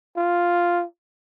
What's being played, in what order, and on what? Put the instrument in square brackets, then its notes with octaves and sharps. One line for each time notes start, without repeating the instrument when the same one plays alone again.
[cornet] F4